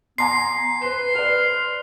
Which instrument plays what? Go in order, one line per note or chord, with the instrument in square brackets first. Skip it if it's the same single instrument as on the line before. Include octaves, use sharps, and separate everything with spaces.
[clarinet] B3 [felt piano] G#5 A#5 C6 [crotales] C7
[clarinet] B4 [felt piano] C5 E7 [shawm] C6
[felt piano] B4 D5 [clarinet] F6